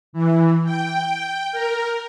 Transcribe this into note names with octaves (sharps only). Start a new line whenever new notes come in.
E3
G5
A#4